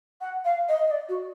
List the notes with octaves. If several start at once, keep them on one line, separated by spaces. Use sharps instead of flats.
F#5
F5
D#5
D#5
D5
F#4